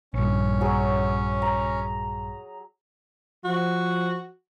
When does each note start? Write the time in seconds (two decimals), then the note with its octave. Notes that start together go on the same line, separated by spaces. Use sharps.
0.14 A#1 G2 C#4
0.61 F#3 G#4
1.42 A#5
3.45 F3 F#4